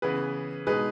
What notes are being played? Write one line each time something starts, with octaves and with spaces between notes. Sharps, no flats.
C#3 E3 B3 G#4 B4
B2 G#3 D#4 G#4 B4